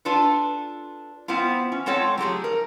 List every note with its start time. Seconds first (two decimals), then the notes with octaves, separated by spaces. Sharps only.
0.05 D4 F4 A4 B4
1.28 B3 C4 E4 F4
1.72 C#4
1.86 G#3 C4 F4 A4 C#5 F#5
2.18 F#3 A3 G4 G#4
2.44 A#4